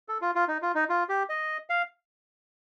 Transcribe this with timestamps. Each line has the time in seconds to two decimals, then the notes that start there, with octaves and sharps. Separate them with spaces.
0.09 A4
0.22 F4
0.35 F4
0.48 D#4
0.62 F4
0.75 D#4
0.90 F4
1.09 G4
1.29 D#5
1.70 F5